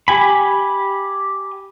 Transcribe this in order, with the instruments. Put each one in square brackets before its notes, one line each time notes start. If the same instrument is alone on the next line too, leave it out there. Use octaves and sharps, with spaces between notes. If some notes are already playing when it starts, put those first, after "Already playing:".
[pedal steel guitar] G4 G#5 B5